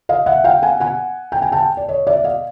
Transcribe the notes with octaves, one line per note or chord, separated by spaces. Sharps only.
D#5 F5
E5 F#5
F5 G5
F#5 G#5
F#5 G#5
G5
G#5
G5 A5
D5
C#5 D#5
D5 E5
D#5 F5